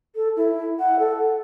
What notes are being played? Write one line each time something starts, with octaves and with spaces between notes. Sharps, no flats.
A4
E4
F#5
A4